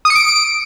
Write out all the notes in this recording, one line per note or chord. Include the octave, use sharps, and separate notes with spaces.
D#6
C#7
D7